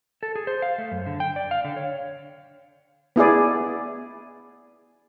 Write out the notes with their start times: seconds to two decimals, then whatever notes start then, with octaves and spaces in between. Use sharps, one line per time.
0.23 A4
0.36 G#4
0.47 C5
0.62 F5
0.78 A3
0.92 F#2
1.07 D3
1.20 G5
1.36 D5
1.51 F5
1.65 D3
1.76 C#5
3.16 B3 E4 G#4 D5